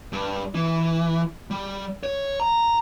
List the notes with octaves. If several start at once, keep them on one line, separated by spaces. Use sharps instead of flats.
G2
E3
G3
C#5
A#5